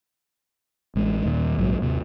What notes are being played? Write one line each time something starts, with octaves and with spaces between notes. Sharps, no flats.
A1 G#3
D#2 A#2
A#1 G#2 C#3 F#3
D#2 C3